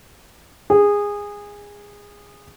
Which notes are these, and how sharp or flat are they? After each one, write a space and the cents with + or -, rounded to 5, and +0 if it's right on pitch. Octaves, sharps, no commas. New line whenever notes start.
G#4 -20